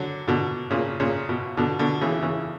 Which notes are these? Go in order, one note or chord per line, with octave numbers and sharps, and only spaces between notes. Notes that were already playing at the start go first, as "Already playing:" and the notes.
Already playing: D3 F#3
B2 D3
A#2 C#3
A#2 C#3
B2
B2 D3
B2 D3
C#3 E3
C#3 E3